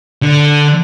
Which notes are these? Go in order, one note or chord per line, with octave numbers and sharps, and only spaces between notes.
D3